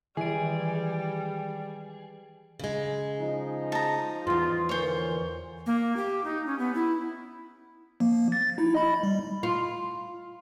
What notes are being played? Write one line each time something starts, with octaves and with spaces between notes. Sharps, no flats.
D#3 E3 G3 G#3 G#4 D7
C#3 G#3
F3 D#4
A5 A#5
E2 G2 F4
A#2 D3 E3 C5 C#5
A#3
G4
D#4
C#4
B3
E4
F3 A#3
A6
D#4 E4
D#5 B5
G3
F4